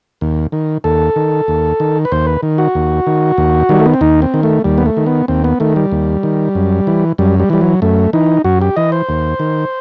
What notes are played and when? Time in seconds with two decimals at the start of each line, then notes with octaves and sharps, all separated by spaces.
0.21 D#2
0.52 D#3
0.84 D#2 A4
1.16 D#3
1.48 D#2
1.80 D#3
2.05 B4
2.12 D#2 C5
2.27 B4
2.43 D#3
2.58 F#4
2.75 D#2
3.07 D#3
3.38 D#2
3.69 D#3 G3
3.79 A3
3.86 B3
3.94 C4
4.01 D#2 D#4
4.22 C4
4.34 D#3
4.43 A3
4.64 D#2 G3
4.78 B3
4.86 A3
4.97 D#3
5.06 B3
5.28 D#2 C4
5.44 B3
5.60 D#3 A3
5.76 G3
5.92 D#2
6.23 D#3
6.55 F#2
6.87 E3
7.18 F#2 G3
7.40 G3
7.50 E3 G3
7.61 F#3
7.82 F#2 A3
8.13 E3 D#4
8.44 F#2 F#4
8.62 G4
8.76 E3 D#5
8.92 C5
9.09 D#2
9.40 D#3